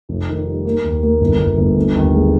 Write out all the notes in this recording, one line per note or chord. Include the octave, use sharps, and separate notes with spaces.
F1
D#3
G3
A#3
D#2
A#3
G1
G1
G1
D3
D#2
G#3